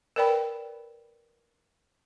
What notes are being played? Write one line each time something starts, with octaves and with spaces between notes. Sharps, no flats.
A#4 B4 D5 G5 B5